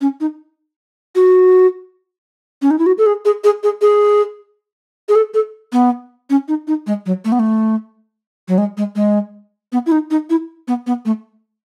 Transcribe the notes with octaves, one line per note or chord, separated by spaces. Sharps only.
C#4
D#4
F#4
C#4
D#4
E4
F#4
A4
G#4
G#4
G#4
G#4
G#4
G#4
A4
A4
B3
C#4
D#4
D#4
G#3
F#3
A3
B3
A3
F#3
G#3
G#3
G#3
B3
E4
D#4
D#4
E4
B3
B3
A3